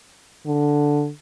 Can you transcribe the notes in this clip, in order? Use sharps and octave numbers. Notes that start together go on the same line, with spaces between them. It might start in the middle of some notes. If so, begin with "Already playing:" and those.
D3